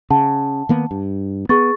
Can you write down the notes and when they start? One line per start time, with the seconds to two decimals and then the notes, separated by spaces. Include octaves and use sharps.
0.10 C#3 F#5 A5
0.69 D#3 A#3 B3
0.91 G2
1.49 B3 G#4 C#6 A6